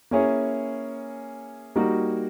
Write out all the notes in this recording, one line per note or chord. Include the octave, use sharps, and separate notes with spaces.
A#3 C#4 E4 G#4 C#5
G3 A#3 D#4 F#4